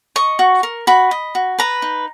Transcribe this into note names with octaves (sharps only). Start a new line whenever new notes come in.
D#5 C#6
F#4
A#4
F#4 B5
D#5
F#4
B4 A#5
D#4